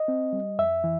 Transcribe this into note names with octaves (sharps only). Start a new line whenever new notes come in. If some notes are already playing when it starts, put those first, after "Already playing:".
Already playing: D#5
C4
G3
F2 E5
E3